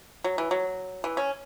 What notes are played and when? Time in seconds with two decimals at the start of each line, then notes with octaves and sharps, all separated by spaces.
0.24 F#3
0.38 E3
0.51 F#3
1.04 E3
1.17 C#4